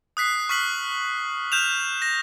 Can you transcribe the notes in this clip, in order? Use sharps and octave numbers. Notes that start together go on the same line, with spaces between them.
D#6 F#6 B6 C7
C#6 F6 B6 C7 F#7
F6 G6 E7 F7
A#6 E7